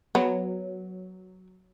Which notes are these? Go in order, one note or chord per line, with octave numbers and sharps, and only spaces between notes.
F#3 B3